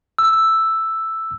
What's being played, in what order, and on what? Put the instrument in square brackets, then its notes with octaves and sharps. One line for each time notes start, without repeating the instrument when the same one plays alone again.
[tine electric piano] E6